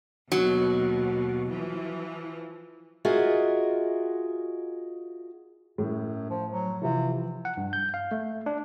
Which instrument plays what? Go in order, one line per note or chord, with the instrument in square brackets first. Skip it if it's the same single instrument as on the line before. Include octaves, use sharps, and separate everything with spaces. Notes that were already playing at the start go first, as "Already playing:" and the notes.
[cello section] D#2 B2 [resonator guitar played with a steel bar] F#3
[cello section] E3 F3
[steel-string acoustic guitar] F4 F#4 G#4 A#4 D#5 E5
[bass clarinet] F#2 [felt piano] A2
[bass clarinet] F3
F#3
[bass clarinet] C3 [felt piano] E3 F3
[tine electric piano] F#5
G2
G6
F5
A3
D4